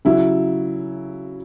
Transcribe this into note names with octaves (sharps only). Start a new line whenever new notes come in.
C#3 F#3 C#4 E4